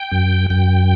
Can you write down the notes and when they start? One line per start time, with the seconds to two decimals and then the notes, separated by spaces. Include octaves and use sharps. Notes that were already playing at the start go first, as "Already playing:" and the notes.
Already playing: G5
0.12 F#2
0.50 F#2 G5